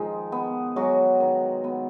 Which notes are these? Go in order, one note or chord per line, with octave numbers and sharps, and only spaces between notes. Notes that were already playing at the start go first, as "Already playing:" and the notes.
Already playing: D#3 F3 G#3
B3
F#3 G#3 F#4
D#3
B3